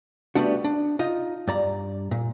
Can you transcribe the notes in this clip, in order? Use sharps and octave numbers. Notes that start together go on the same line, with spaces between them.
G3 A3 B3 D4 F#4
D4
D#4 F4 D#5
G2 D5 A#5
A#2